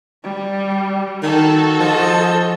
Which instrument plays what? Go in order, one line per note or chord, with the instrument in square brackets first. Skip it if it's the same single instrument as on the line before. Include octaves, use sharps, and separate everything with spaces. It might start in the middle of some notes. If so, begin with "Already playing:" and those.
[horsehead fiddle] G3
[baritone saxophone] D#3 [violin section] F#4 A4
[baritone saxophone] F3 [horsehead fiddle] D#5 A5